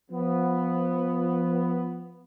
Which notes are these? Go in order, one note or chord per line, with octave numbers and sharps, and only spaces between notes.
F3 B3